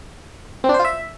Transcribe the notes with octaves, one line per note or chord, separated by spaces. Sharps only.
C4
D4
C5
F4
E5